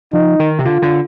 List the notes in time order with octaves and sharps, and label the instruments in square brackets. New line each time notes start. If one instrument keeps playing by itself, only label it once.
[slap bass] F3 [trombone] D#4
[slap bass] D#3
C3
[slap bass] D3 [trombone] F4
[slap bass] D3